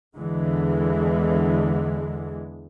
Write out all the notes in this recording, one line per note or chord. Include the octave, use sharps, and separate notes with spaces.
E2 D3 E3 G#3